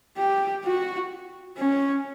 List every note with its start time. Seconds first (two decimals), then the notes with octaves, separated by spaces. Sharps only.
0.18 G4
0.65 F#4
1.58 C#4